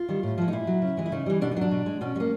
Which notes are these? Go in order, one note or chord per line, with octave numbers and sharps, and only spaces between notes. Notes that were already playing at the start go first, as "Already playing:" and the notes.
Already playing: F4
D#3 G3
A2
F3 G#3
D#4
A#2 E4
F#3
C#3
E3 G#3
E4
C#3 D#4
E3 G3
B2 D4
D#4
F#3 D4
B2
G#3
B2 C#4
G#3
A#3